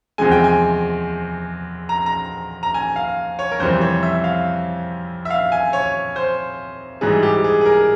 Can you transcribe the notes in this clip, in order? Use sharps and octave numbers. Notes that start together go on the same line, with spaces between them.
E2 C3 F3 G#3 G#5
G5
G#5
A#5
A#5
A#5
G#5
F5
C#5
A#4
F2 C3 E3 G3 C5
C#5
E5
F5
E5
F5
G#5
C#5
C5
G#2 E3 G3 G#4
G4
G#4
G#4
A#4